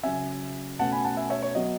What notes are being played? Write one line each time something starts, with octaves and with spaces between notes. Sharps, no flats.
C#3 F#3 C#4 E5 G#5
B2 A3 C#4 F#5 A5
G#5 B5
F#5 A5
E5 G#5
C#5 E5
C#5
F#3 B3 D#5